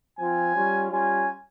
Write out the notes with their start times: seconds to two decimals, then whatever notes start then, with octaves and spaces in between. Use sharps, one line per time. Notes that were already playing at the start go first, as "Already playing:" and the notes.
0.19 F3 C4 F4 G#5
0.55 G3 C#4 F4
0.91 G3 C#4 F4 G#5